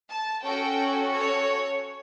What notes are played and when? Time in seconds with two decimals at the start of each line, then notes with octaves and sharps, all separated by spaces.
0.09 A5
0.44 C#4 F#4 A4 G5
1.15 C#5